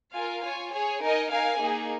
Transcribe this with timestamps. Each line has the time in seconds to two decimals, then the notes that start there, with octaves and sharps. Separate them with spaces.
0.15 F4 A#4 F5 G#5
0.44 F4 C#5 G#5
0.73 G#4 C#5 G#5
1.02 D#4 A#4 D#5 G#5
1.31 D#4 A#4 F5 G#5
1.59 A#3 D#4 G#4